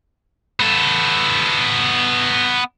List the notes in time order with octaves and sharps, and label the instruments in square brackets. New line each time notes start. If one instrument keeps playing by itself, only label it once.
[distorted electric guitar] B3 A4